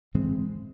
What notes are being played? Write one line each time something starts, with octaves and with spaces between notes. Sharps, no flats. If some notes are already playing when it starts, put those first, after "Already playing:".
A2 E3 G#3 C4